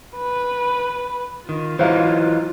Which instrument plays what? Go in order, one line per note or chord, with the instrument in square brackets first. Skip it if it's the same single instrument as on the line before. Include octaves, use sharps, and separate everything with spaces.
[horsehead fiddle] B4
[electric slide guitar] D#3 [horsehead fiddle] F4
[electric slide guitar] E3 F#3 D#4 [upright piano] C5 F5